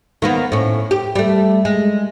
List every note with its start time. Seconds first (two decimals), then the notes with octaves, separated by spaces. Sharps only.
0.22 D#3 A#3 B3
0.52 A2 C#4
0.91 G4
1.15 G3 A3
1.65 G#3